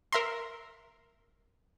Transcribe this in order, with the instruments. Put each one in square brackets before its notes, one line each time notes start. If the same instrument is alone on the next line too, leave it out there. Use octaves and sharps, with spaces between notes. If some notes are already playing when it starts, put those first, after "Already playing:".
[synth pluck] A#4 E5 A#5 C6